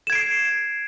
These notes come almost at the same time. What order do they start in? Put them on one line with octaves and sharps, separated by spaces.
E7 G#6 D7 C7